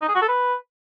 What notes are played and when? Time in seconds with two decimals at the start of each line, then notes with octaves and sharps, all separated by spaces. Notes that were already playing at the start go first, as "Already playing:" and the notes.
0.02 D#4
0.08 G#4
0.15 F#4
0.22 A4
0.28 B4